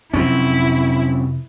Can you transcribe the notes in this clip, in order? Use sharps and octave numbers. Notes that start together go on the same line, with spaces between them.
F2 C3 F#3 C4 C#4 E4